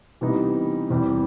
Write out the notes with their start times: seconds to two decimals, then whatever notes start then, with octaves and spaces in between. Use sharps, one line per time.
0.21 C3 E3 G3 B3 D#4
0.90 E2 C3 E3 G3